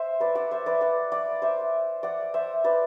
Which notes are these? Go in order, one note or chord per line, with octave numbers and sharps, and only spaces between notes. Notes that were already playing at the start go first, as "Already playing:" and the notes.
Already playing: C5 E5
B4 D5
D5 F#5
C5 E5
B4 D5
D5 F#5
D5 F#5
C5 E5
D5 F#5
C5 E5
B4 D5